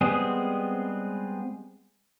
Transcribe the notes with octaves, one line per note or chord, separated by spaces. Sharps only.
G3 G#3 B3 C4 G#4